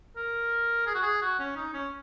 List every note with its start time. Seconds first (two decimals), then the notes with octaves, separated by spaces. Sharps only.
0.17 A#4
0.87 G#4
0.95 F#4
1.02 G#4
1.22 F#4
1.39 C#4
1.56 D#4
1.73 C#4